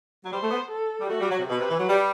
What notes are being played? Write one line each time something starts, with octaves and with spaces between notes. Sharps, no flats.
F#3
G3 C5
A3
B3
A4
G3
A3 F#4
G3
F#3
C3
B2 B4
C3
E3
F#3
G3